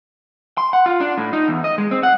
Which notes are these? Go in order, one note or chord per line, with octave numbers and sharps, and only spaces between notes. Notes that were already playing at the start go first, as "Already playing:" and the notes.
C6
F#5
F4
D4
A2
D#4
E2
D#5
G#3
C4
F#5